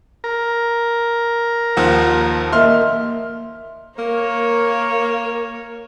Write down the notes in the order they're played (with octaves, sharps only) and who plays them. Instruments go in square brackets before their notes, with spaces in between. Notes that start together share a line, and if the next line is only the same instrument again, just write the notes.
[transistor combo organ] A#4
[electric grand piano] D#2 F3 F#5
[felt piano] A#3 D#5 E5 [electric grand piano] C6 F6
[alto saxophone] A#3 [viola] A#4 C#5